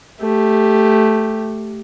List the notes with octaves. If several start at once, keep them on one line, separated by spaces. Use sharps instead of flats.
A3 G4